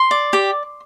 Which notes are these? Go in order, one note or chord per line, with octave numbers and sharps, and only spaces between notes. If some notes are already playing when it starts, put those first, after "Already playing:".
Already playing: C6
D5
G4